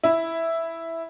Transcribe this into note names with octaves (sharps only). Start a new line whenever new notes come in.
E4